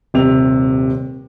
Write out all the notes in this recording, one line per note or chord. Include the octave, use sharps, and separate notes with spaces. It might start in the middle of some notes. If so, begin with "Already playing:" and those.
D#1 C3 F7